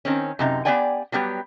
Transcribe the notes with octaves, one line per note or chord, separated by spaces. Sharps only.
D#3 C4 C#4
F#2 C3 D#4
B3 C4 G4 D5 G5 G#5
F#3 G3 B3 G4